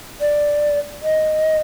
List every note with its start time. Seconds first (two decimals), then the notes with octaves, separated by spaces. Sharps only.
0.21 D5
1.03 D#5